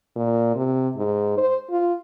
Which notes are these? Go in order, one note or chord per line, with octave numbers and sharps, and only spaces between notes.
A#2
C3
G#2
C5
F4